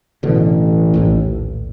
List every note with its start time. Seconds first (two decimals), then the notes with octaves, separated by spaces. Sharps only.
0.23 A1 B2 D3
0.94 A#1 D#2 A2